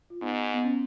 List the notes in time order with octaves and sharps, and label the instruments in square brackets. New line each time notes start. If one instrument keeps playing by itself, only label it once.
[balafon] F4
[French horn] G#2 [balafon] B3 D#4
[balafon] B3
C#4